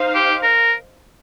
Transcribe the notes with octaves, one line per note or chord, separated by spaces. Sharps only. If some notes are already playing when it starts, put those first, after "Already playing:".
Already playing: D#4 C5 F5
G4
A#4